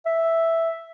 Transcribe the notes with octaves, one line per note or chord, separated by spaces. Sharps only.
E5